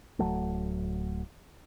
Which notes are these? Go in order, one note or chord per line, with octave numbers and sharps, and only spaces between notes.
D1 F#2 F#3 A3